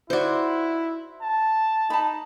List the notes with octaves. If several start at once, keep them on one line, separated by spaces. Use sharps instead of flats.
D#4 E4 F#4 C5 D5
A5
D#4 A5 B5